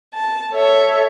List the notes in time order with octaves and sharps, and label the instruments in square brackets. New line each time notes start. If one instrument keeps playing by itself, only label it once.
[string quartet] A5
A4 C#5 E5